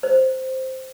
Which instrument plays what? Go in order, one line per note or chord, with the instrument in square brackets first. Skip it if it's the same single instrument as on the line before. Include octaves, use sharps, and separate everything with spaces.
[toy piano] C5